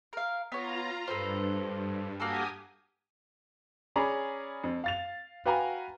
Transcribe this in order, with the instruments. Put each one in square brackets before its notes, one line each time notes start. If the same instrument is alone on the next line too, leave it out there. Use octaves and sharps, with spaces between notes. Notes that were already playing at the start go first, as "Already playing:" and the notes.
[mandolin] A#4 F5
[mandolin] B3 C#5 [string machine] F4 A#5
[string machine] G2 [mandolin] A4 B4 C5
[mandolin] A#3 F#4 A4 [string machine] G4 G#5 D#6
[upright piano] C#4 G#4 D5 A#5 B5
F2
F5 A6 F7
F#4 B4 F5 G5 G#5 A#5